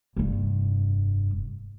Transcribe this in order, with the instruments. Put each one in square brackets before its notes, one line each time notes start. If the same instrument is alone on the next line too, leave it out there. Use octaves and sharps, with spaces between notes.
[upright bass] F1 G2